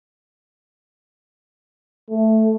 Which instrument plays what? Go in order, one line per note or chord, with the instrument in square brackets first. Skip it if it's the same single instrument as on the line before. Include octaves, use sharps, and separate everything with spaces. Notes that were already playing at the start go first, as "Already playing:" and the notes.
[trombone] A3